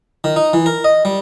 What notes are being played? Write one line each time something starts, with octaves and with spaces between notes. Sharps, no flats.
D#3
D#4
E3
A#4
D#5
G3